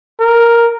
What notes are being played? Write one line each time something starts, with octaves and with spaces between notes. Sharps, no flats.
A#4